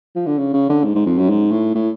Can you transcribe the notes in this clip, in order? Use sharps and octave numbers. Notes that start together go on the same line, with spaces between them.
F3
D3
C#3
C#3
D3
G#2
G#2
F2
F#2
G#2
A2
A2